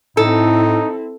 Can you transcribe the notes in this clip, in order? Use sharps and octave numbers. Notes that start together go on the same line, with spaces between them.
A2 C4 D#4 E4 A4